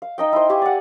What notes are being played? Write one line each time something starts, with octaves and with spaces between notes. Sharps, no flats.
F5
D#4 D#5 G5
E4 C5
G4 F5 G#5 C#6
D5 F#5